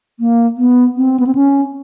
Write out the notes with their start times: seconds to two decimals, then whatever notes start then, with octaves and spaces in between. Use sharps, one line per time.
0.20 A#3
0.58 B3
0.97 C4
1.20 B3
1.27 C4
1.35 C#4